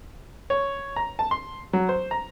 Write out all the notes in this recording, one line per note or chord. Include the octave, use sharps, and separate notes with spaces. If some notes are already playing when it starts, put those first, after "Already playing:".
C#5
A#5
A5
C6
F#3
C5
A#5